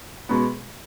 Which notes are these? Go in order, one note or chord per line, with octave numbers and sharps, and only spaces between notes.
B2 G#3 B3